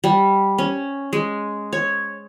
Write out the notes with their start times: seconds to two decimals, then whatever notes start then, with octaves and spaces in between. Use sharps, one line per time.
0.04 G3
0.58 C#4
1.13 G#3
1.73 C#5